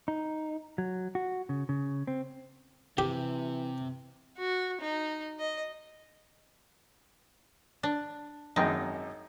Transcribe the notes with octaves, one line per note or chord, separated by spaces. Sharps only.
D#4
F#3
F#4
C#3
C#3
C4
C3 E3 G4
F#4
D#4
D#5
D4
G#1 F#2 D#4 G5